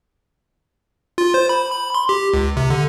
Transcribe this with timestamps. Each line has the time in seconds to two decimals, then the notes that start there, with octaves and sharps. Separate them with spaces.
1.18 F4
1.34 C5
1.49 B5
1.72 B5
1.94 C6
2.09 G4
2.33 C#2
2.57 C3
2.70 D3